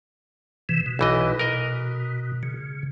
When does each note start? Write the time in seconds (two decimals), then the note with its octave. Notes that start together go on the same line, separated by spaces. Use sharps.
0.69 C3 E3
0.86 B2
0.99 B1 E3 D#5
1.39 A#4 D#5
2.43 C#3